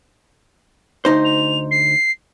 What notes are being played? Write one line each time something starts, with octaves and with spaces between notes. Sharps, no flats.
D2 D#4 C5
F7
C7